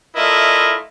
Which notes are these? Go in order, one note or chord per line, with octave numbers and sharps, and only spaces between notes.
A3 E4 F4 A#4 D5 D#5